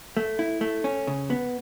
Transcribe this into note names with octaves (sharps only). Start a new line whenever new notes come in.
A3
E4
A3
C#4
C#3
B3